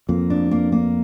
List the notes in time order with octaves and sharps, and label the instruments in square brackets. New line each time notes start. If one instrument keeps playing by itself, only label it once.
[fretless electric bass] F2 [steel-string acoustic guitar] A#3
[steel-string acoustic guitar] D4
A#3
A#3